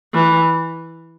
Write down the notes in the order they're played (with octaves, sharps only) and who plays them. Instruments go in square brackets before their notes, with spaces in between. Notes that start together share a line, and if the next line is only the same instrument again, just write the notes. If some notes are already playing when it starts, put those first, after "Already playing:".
[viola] E3